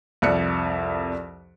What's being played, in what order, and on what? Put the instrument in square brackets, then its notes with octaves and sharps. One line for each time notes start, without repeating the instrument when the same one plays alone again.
[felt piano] C2 F2 D5 F#6 C#7